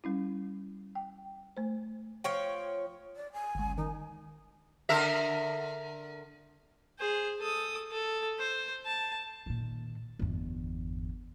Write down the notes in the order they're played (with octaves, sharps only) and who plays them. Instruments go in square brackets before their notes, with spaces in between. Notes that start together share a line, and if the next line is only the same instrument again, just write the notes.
[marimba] G3 C#4 E4
G5
A3 C5
[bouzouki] F3 C#5 G5
[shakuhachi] D5
G#5
[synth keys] G1 C#2
[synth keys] D#3 [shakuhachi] D#4
[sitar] D3 A#4 E5
[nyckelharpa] G#4 C5
A4 D#6
A4
C5
A5
[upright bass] A#2 D#3
G1 E2